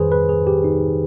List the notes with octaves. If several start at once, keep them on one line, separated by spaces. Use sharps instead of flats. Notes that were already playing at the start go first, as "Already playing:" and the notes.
Already playing: F2 D#3 G#4 B4 C5
B4
G#4
G4
D#4